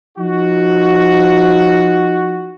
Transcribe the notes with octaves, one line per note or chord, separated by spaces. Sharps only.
F3 D#4 F#4